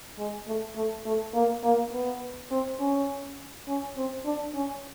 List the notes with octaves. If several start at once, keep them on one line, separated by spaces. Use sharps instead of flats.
G#3
A3
A3
A3
A#3
A#3
B3
C4
C#4
C#4
C4
D4
C#4